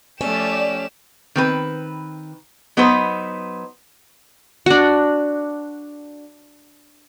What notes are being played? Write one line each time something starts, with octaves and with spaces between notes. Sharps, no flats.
F3 A3 C#4 G4 D5 E7
D#3 C4 B4
F#3 B3 D#4 B4 C5
D4 F#4